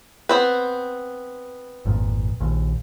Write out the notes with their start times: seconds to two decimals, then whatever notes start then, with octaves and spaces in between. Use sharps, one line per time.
0.29 B3 C4 B4
1.85 G#1 F2 A#2
2.40 A#1 D#2